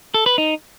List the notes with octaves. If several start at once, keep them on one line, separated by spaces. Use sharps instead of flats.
A4
B4
D#4